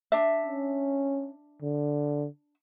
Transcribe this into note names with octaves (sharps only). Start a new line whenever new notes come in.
D4 E5
C#4
D3